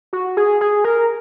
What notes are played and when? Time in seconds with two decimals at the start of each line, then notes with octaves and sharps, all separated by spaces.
0.13 F#4
0.37 G#4
0.61 G#4
0.84 A#4